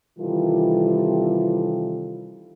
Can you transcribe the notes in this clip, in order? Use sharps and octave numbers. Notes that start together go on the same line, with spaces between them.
C3 D#3 E3 G3 F4 A4